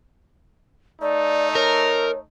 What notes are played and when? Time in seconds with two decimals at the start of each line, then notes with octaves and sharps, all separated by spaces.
1.01 A3 D#4 D5
1.55 A#4 C#5